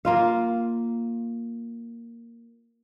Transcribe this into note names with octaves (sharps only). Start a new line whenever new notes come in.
A#3 F4 F5